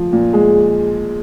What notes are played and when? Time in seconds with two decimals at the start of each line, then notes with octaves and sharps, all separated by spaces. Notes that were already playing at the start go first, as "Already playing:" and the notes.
Already playing: F3
0.13 A#2
0.33 G#3